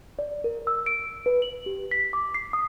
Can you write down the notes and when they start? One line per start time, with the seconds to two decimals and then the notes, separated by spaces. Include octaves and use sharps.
0.19 D5
0.44 A#4
0.67 E6
0.86 D7
1.26 B4
1.42 F#7
1.66 G4
1.91 B6
2.13 D6
2.34 C7
2.53 D#6